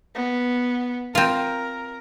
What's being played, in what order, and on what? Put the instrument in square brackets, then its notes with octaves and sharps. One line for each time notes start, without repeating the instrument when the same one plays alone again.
[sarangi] B3
[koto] C4 F4 [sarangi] A#4